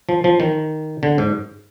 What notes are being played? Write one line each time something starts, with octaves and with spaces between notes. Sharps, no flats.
F3
F3
D#3
D3
G#2